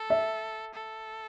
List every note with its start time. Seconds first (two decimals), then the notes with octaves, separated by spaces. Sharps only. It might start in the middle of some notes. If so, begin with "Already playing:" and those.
Already playing: A4
0.10 E5
0.74 A4